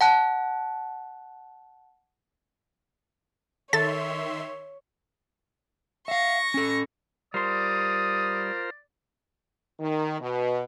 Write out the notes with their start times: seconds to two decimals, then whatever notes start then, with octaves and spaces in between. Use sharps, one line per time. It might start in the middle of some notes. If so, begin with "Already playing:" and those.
0.01 F#5 A5 F#6
3.73 D#3 A4 C#5 E5 C6 A6
6.08 E5 F5 C#6 A#6
6.54 C#4 A4
7.34 G3 F4 A#4 C5 D5 C6 D#6
9.80 D#3
10.20 B2